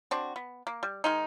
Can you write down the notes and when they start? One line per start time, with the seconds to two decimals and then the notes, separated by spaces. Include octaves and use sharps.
0.11 C4 D4 F#4
0.36 B3
0.67 A#3
0.83 G3
1.04 D#3 G#3 D#4